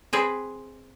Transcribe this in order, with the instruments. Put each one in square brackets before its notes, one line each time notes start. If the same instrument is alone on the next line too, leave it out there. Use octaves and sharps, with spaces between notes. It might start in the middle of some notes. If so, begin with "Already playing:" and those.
[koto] C4 G#4 B4